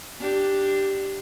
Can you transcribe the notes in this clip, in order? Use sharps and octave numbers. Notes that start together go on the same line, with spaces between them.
D4 G4